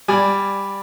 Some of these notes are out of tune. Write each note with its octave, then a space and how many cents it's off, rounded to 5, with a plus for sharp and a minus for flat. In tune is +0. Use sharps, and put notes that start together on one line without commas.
G3 +10 D5 +0 G#5 +0